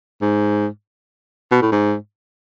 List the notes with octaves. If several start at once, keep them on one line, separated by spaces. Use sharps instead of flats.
G#2
B2
A2
G#2